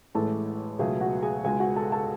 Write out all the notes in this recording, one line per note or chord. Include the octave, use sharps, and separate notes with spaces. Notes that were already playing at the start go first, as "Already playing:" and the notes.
A1 A2 G#3 A4 A5
C#2 B2 F#3 A3 G#4 G#5
F#4 F#5
G#4 G#5
C#2 B2 G#3 G#4 G#5
F#4 F#5
A4 A5
A4 A5